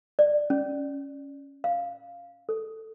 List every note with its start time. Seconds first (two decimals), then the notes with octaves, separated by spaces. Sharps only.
0.19 D5
0.50 C#4
1.64 F5
2.49 A4